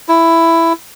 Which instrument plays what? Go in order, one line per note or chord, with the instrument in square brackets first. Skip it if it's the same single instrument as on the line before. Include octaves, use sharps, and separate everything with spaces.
[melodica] E4